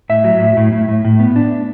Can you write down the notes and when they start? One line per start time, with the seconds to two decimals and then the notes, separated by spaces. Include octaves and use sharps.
0.09 A2 E5
0.24 F#3
0.40 A2
0.57 A2
0.72 A2
0.89 A2
1.05 A2
1.19 B3
1.36 D4